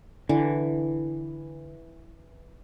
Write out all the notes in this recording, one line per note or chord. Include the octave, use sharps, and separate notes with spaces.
D3 E3